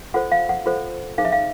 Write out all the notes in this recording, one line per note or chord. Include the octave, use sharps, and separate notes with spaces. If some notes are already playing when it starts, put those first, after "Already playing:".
F4 A4 C5 F#5
F5
F#5
F4 A4 C5
D#4 G#4 C5 F5
E5
F5